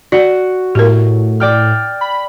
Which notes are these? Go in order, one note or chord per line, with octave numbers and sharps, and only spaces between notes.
F#4 D5 F#5
A2 G4 A#4
D5 G5 F6
B5